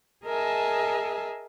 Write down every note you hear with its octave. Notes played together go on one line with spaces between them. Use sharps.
G#4 A#4 D#5 E5 G#5 A5